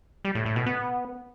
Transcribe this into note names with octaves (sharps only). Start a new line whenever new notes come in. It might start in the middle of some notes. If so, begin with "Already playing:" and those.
G3
A2
A2
B2
B3